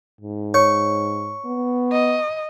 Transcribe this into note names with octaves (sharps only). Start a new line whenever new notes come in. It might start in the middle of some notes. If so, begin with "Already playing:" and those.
G#2
C#5 C#6
B3
D#5